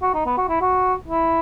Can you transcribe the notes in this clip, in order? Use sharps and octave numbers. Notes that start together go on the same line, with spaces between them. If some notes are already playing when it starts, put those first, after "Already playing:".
F#4
D#4
B3
F#4
E4
F#4
E4